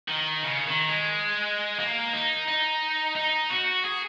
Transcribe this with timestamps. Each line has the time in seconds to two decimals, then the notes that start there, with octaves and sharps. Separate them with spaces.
0.08 D#3
0.43 C#3
0.65 D#3
0.88 G#3
1.79 A#3
2.13 D#4
2.48 D#4
3.16 D#4
3.50 F#4
3.85 G#4